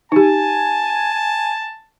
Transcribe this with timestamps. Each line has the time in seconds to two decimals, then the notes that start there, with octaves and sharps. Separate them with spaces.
0.12 D#4 G4 G#5 A5